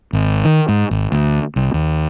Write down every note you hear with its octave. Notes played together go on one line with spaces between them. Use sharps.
G#1
D#3
G#2
G#1
D2
C2
D#2